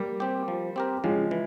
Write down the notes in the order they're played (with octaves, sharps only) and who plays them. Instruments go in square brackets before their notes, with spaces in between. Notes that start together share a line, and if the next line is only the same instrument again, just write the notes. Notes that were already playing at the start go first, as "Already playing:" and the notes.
Already playing: [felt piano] G3 A#3
[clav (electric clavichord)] C4 G4
F3
C4 G4 A#4
[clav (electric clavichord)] C#3 [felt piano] F3 G#3
[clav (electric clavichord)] E3